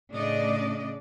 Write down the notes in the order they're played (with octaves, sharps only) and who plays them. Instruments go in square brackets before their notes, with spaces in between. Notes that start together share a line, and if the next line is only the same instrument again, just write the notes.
[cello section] A2 C#3 A3 D4 D5 D#5